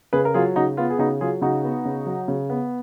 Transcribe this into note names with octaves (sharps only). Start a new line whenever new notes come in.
C#3 G#4 B4
A#4
F#3 F4 G#4
C#3 D#4 F#4
B3 F4
G#4
C#3 D#4 F#4
F#3 F4 G#4
C#3 D#4 F#4
B3
C#3
F#3
C#3
B3